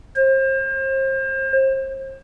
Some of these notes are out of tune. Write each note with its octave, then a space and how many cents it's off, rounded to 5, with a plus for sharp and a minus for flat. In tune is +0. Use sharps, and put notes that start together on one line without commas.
C5 +35